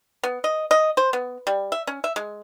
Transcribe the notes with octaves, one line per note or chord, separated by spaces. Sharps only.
B3
D#5
D#5
C5
B3
G3
E5
C#4
E5
G#3